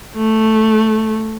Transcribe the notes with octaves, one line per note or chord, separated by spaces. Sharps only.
A3